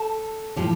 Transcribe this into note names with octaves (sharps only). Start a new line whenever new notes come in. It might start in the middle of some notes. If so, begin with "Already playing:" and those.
Already playing: A4
A2 F3 G4